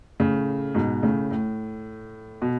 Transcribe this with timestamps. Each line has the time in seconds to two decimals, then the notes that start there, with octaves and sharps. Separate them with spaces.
0.20 A2 C#3
0.75 G#2 B2
1.02 A2 C#3
1.31 A2
2.42 B2